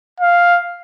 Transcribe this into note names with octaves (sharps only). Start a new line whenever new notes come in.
F5